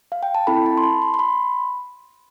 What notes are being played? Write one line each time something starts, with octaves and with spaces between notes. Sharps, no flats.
F5
G5
A5
C4 E4 A4 B5
A5
C6
B5
C6
C6
B5